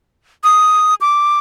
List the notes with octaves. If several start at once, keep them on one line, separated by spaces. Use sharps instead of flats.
D#6
D6